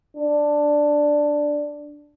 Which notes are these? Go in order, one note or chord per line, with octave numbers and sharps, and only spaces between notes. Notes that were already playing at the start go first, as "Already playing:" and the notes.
D4